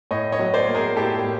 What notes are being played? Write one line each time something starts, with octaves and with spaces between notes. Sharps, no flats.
A2 C#5 D#5
C#5 D#5
F#3
C5 D5
A#3
G#4 A#4
A2 G4 A4
A2